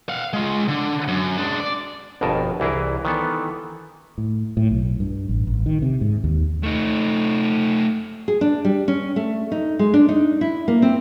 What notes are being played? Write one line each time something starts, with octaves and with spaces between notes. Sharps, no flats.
F5 F#5
G#3 F4
D3
F#2
G#3 D4
D5
G1 F2 B2 A#4 G#5 A5
C2 E3 E4 G#4 A#4
D#3 E3 B3 A4
A2
A2
B1
G2
A1
A1
D#3
C3
G#2
D#2
A3 D#4
G#4
D4
G3
C#4
A3
D#4
G#3
D4
D#4
E4
A#3
C4